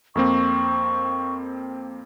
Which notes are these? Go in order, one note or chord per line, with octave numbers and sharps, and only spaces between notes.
F2 A#3 C4 C#6